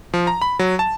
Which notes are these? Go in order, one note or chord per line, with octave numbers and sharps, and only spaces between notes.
F3
A#5
B5
F#3
A5